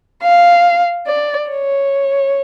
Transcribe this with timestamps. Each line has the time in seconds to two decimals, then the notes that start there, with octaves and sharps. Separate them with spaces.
0.23 F5
1.07 D5
1.50 C#5